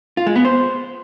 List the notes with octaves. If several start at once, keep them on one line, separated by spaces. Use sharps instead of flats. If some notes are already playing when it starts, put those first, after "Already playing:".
F4
G#3
B3
C5